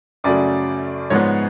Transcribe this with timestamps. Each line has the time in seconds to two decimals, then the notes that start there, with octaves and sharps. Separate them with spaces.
0.24 F#2 C#3 F#3 A3 D5
1.10 G#2 F3 G#3 B3 C#5